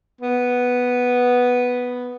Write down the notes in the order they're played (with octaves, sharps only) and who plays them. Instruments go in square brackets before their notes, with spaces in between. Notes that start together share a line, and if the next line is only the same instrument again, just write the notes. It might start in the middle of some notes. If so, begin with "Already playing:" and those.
[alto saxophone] B3